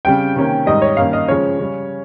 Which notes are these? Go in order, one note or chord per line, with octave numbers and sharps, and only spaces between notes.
C#3 G3 C4 G5
C3 D#3 A#3 C#4
G#2 D#3 G3 D#5
C#5
G2 D#3 A#3 C#4 F5
D#5
C#3 F3 G#3 C#4 C#5
C#3 G3 C#4